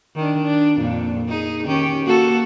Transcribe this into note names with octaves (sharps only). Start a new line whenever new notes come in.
D#3 D4
D4
F2 A#2
D#4 G#4
D#3 C#4 G4
A#3 F#4 A4